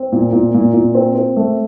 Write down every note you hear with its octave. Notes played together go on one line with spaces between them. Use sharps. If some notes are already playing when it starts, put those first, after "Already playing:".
Already playing: C4
A#2
A#2
A#2
A#2
C4
C4
A3